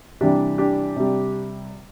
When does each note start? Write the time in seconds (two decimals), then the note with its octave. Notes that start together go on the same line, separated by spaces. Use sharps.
0.21 C3 E3 G3 D4 G4
0.58 D4 G4
0.96 C3 G3